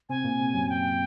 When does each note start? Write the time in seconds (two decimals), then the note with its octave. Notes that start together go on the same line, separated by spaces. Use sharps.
0.09 C3 C4 G#5
0.24 A#2 A#3
0.39 C3 C4
0.54 F#2 F#3
0.69 G5